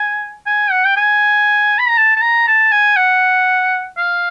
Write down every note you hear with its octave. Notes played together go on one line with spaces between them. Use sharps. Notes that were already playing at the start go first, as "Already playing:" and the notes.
Already playing: G#5
G#5
F#5
G5
G#5
B5
A#5
A5
A5
A#5
A5
G#5
F#5
F5